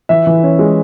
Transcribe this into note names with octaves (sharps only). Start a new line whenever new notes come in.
E3 E5
E3
C#4
G#3